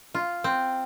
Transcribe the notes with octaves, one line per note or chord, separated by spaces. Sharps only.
F4
C4